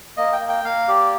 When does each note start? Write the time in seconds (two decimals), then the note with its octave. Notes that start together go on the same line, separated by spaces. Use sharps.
0.17 A#3 D#5
0.33 G5
0.41 A#3
0.49 G5
0.64 A#3 F5
0.88 G4 D5